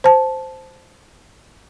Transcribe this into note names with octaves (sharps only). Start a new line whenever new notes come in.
C5 A5